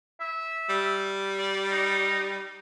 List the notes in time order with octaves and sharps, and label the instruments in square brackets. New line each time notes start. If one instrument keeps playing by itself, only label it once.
[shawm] E5
[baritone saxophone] G3
[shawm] D5
D#4